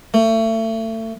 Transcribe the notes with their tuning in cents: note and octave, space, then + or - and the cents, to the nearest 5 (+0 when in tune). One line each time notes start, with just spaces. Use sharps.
A3 +30